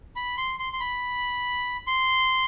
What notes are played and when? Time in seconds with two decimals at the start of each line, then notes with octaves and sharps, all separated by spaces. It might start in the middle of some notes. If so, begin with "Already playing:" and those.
0.16 B5
0.38 C6
0.60 C6
0.73 C6
0.80 B5
1.87 C6